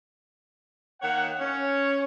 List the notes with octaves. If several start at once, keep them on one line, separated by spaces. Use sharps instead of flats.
D#3 A#3 C#5 F#5
C#4 C#5